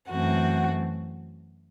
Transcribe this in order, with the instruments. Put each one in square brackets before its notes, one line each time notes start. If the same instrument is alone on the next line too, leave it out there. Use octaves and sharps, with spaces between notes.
[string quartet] F#2 E3 A3 C4 F#4 F#5